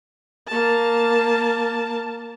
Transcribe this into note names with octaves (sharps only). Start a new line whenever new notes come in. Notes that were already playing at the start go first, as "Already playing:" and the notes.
A#3 A5